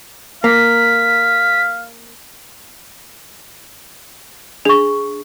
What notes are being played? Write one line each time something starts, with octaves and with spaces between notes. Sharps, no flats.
A#3 F5 B6
D4 G#4 C#6